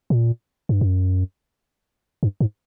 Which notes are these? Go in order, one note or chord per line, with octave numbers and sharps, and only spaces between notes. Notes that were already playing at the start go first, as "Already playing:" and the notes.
A#2
G2
F#2
G2
G#2